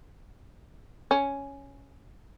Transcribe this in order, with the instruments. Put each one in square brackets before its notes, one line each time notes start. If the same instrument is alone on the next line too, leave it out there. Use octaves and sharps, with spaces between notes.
[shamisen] C#4